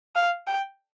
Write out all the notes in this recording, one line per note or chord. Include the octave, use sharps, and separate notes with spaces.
F5
G5